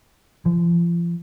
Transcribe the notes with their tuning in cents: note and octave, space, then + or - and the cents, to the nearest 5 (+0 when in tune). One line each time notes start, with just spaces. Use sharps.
F3 -35